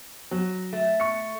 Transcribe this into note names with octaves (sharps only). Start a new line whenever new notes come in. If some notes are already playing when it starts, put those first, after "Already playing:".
F#3
A3
C#6 C#7